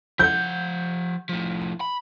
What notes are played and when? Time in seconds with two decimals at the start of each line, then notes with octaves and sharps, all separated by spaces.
0.19 F3 F#5 G6
1.29 A2 F3
1.81 B5